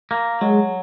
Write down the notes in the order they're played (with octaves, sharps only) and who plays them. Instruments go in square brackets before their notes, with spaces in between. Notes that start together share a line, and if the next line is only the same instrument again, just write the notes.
[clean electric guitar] A#3
[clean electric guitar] F#3 [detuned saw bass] G#3